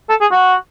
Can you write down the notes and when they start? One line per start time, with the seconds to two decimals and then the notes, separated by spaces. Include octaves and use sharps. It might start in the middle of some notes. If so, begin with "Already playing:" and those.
0.10 A4
0.21 G#4
0.31 F#4